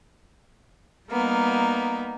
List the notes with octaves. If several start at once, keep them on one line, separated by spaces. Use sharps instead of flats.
G3 A#3 B3 D#4